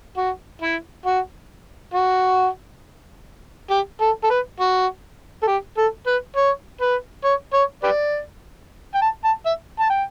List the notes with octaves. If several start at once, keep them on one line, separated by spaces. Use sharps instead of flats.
F#4
E4
F#4
F#4
G4
A4
A4
B4
F#4
A4
G4
A4
B4
C#5
B4
C#5
C#5
G4 B4 D5
G5
A5
A5
E5
A5
G5